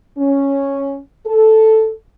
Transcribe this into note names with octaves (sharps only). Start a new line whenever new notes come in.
C#4
A4